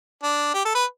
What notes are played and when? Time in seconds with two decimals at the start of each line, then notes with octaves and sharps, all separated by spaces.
0.23 D4
0.54 G4
0.65 A4
0.74 B4